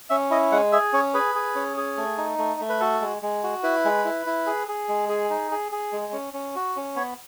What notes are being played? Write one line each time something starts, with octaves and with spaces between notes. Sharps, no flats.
C#4 E5
E4 D#5
G#3 F#5
G#4 E5
C#4 C#5
G#4 B4
G#4
C#4
G#4
A3
D#4
A3
A3
B4
F#4 A4
G#3
G#3
F#4
E4 B4
G#3
E4
E4
G#4
G#4
G#3
G#4
D#4
G#4
G#4
G#3
C#4
C#4
F#4
C#4
B3 C#5